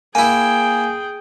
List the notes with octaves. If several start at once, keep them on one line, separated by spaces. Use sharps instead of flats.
A#3 E4 G#4 G5 G#5